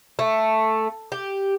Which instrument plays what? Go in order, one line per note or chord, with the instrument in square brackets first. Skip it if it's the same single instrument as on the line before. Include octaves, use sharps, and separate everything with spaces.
[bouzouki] A3
G4